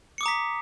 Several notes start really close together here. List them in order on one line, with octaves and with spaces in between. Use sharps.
C#7 D6 D#6 A#5 B6